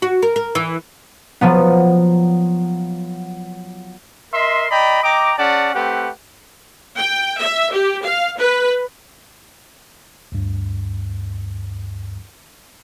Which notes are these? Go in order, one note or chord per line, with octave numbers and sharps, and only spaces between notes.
F#4
A#4
A#4
E3
F3 F#3 B3
A#4 D#5 E5 C6
D5 D#5 G5 A#5 B5
D#5 G5 A#5 D6
C#4 G#4 D5 F#5 A5
A3 C4 G4 B4 F#5
G5
E5
G4
F5
B4
D2 G2